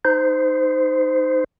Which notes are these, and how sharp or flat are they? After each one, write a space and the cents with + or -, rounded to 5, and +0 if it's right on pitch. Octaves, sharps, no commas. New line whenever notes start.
D#4 +0 C5 -20